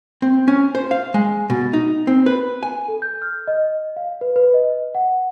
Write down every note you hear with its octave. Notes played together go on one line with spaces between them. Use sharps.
C4
C#4
C5
F5
G#3
B2
D#4
C4
B4
G#5
A4
G6
F6
D#5
F5
B4
B4
D#5
F#5